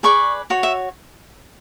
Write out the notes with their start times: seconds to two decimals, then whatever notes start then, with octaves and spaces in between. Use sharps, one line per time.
0.03 G#4 B4 D5 C#6
0.50 F#4 C#5
0.63 E5